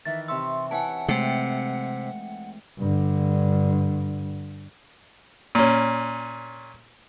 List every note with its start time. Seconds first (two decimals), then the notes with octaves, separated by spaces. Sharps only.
0.05 D#3 E3 E5 A6
0.28 C3 E5 C6 C#6 E6
0.71 E4 B4 C#5 F#5 G#5 A5
1.08 C3 G#3 A3 C4 E5 G5
2.79 G2 D3
5.55 A#2 C#4